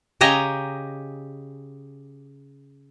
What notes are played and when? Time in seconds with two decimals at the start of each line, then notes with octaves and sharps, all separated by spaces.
0.21 C#3 G4 D#5 G#5 A#5